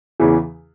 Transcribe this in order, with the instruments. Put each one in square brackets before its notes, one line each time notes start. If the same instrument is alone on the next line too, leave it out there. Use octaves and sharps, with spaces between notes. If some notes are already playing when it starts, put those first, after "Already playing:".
[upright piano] E2 C#3 E3